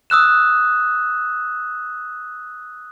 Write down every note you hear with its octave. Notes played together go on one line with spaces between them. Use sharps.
D#6 E6 F#6 E7